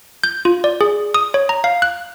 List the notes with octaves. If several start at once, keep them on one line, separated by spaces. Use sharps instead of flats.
G6
F4
D5
G#4
D#6
C#5
A#5
F5
F#6